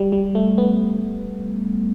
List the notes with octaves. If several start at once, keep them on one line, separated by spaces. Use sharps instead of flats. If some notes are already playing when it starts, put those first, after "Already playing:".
Already playing: G3
G3
A3
B3